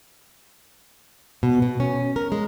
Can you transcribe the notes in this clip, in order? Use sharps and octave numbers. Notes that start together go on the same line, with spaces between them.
B2
B2
C#4
A#4
G#3